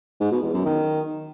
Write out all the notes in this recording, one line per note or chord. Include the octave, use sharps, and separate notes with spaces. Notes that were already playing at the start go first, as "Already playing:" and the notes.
G#2
B2
E2
F#2
D#3